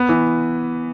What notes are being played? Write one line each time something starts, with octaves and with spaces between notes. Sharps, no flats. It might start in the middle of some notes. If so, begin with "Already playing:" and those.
Already playing: B3
E3